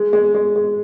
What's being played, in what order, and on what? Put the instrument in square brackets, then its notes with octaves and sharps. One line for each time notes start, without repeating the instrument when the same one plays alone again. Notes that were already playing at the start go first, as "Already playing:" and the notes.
Already playing: [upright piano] G#3
G#3
G#3
G#3